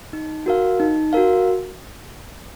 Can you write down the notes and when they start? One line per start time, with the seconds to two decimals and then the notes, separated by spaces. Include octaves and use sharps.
0.13 D#4
0.46 F#4 A#4 F5
0.80 D#4
1.13 F#4 A#4 F5